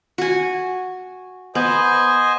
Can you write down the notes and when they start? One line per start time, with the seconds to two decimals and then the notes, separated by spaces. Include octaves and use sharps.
0.18 F#4 G#5
1.55 B3 C5 D#5 G#5